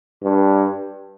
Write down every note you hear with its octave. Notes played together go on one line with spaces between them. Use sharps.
G2